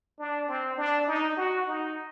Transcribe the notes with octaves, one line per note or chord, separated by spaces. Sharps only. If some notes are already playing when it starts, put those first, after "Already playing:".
D4
C4
D4
D#4
F#4
D#4